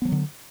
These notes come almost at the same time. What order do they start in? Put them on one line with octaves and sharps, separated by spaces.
B3 F3 F#3 D3